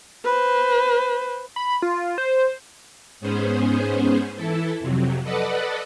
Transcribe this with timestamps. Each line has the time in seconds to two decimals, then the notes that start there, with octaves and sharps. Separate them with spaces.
0.25 B4 C5
1.56 B5
1.82 F4
2.18 C5
3.21 G#2 B3 C#4 G#4 C5
4.35 E3 E4 A4
4.80 F2 C3 F#3
5.23 A4 B4 D5 D#5 F#5